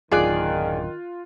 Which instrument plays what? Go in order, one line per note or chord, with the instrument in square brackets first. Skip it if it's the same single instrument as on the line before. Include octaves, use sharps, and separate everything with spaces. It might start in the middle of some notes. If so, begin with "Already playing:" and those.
[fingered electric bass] D1 G#1 F#2 [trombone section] D#3 [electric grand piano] F4 F#6 [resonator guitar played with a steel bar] G#4 D5